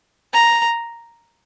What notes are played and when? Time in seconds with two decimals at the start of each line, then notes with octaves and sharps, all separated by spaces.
0.34 A#5